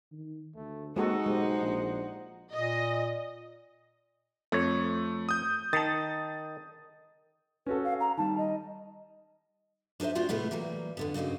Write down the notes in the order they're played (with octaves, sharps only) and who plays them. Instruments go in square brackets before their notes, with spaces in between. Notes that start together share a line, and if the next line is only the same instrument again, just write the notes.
[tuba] D#3
[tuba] D2 [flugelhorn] A3
[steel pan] G#3 F#4 A4 [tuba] A#3 [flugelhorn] C4 [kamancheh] D#4 F#5
[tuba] B1 [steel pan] G#3 G4 [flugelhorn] C5
[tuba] A#1
[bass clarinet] A#2 [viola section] D#5
[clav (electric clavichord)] F2 C#5 [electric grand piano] A3
[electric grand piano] D#6 G6
[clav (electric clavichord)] D#3 A5 [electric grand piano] D#6 A6
[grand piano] C#4 F#4 A4 [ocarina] B4
[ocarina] F5
A#5
[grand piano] D#3 G3 [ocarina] A5
[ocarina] D#5
[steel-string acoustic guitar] D4 D#4 A4 C5 E5
A3 C4 D4 F4 F#4
A2 C3 G#3 A3 B3 E4
E3 F#3 G3 A#3
F2 D3 B3
G2 C#3 A#3 D#4 F#4